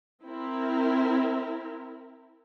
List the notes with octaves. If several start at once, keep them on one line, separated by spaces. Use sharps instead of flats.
C4 E4 A#4